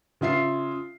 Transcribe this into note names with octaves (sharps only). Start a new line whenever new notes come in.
C#3 F4 E5 C7